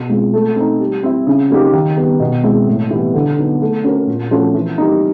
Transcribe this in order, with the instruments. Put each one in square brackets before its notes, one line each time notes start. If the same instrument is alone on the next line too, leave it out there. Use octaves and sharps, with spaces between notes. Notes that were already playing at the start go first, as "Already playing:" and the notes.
Already playing: [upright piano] B2
G#3 C4 F4
A3
C4 D#4
G3
C4 E4
C#3
F#3 A#3 D#4 G4
D#3
G3 B3
B2
G#3 C4 E4
A2
E3 G3 B3
D3
F#3 B3 D#4
A3
C#4 F#4 A#4
A#2
F3 A3 C#4 F#4
E3
G3 A#3 D#4